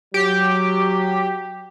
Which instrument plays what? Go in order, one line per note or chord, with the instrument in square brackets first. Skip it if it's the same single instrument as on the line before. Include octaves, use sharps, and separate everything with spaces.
[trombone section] F#3 [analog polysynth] G4